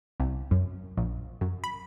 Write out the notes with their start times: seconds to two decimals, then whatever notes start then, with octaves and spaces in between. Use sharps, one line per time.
0.20 C2
0.51 F#2
0.97 A#1
1.41 F#2
1.64 B5